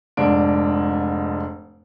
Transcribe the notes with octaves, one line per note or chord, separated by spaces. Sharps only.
F1 G#2 D4 D7